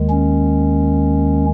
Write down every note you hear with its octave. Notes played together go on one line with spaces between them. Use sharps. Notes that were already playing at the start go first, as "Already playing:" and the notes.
Already playing: D#2 D#3 G#3
C#4